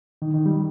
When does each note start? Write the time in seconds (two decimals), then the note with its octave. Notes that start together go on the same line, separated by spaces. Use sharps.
0.22 D#3
0.34 D#3
0.46 G3